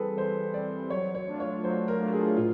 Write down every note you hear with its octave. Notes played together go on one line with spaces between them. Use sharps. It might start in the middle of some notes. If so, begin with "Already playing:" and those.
Already playing: E3 G3 C4 G#4 A4 B4
E3 C5
G3 C4 D5
F#3 C#5
C#5
A3 D4 F4
C#5
F#3 C5
A#4
A3 D4 F4
G#4
A2 F4